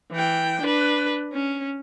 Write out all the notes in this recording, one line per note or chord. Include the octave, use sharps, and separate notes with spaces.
E3 G5
D4 B4
C#4